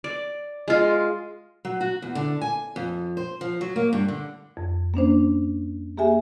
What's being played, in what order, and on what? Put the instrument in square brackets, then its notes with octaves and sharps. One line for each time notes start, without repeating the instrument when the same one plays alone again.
[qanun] D5
G#3 F4
[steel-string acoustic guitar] F#3
F#4
E2
D3
G#5
F2
C5
F3
F#3
A#3
G2
D3
[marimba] F2
A#3 C#4 D4 C5
A#3 G4 G#4 E5 G#5